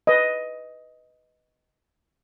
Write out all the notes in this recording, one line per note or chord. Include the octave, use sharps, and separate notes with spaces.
B4 D#5